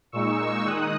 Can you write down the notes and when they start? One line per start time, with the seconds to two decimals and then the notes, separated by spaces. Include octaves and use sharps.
0.12 A#2 G#3 D#4 C#6 E6
0.65 D#3 G#3 D#4 D#6 F#6